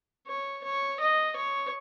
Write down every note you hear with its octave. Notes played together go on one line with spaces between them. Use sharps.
C#5
C#5
D#5
C#5